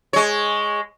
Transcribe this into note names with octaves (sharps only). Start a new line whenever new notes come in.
G#3 C#5